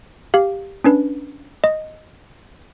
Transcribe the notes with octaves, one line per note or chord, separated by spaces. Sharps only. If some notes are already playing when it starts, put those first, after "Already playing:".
G4 F5
C#4 D4 B4
D#5